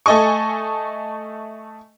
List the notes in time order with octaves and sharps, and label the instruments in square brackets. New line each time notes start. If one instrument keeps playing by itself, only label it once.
[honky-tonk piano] A3 A4 D#5 G#5 C#6